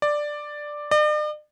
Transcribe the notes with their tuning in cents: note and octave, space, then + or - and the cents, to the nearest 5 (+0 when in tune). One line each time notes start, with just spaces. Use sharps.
D5 +5
D5 +45